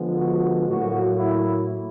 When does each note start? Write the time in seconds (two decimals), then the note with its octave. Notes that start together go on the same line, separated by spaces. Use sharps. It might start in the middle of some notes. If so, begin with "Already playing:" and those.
Already playing: D3 F3 G#3 B3
0.20 F#4
0.68 A2 F#3 A#3 F#4
1.17 E4